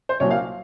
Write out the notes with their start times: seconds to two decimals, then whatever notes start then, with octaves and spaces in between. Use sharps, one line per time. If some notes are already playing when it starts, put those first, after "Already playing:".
0.09 C5
0.20 C2 A#2 F#3 C#5
0.31 F5